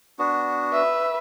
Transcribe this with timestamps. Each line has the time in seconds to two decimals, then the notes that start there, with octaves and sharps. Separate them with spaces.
0.19 B3 D4 F#4
0.73 B4 E5